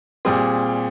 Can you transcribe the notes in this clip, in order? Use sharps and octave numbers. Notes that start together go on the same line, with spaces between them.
A#2 G3 C4 G#4